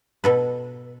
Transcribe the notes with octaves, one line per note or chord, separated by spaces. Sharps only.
B2 A4 B4